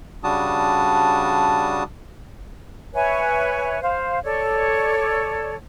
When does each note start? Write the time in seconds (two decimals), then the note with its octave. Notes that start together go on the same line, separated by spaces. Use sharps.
0.24 C#3 G3 D4 F#4 A5 D#6
2.94 B4 C#5 E5 G#5
3.81 C5 F5
4.23 A4 C#5 D5